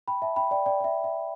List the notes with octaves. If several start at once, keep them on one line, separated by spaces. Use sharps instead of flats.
G5 B5
E5 A5
G5 B5
D5 G5
D5 G5
D5
E5
E5